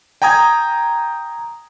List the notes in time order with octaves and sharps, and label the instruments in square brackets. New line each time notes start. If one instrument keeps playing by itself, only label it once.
[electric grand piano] G5 G#5 A#5 D#6 G#6